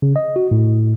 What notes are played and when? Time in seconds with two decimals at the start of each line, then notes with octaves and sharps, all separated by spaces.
0.02 C#3
0.16 D#5
0.36 F#4
0.51 A2